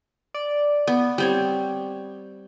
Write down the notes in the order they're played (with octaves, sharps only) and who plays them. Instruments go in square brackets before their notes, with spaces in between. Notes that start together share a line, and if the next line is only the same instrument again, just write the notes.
[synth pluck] D5
[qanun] B3
G3 C4 C#5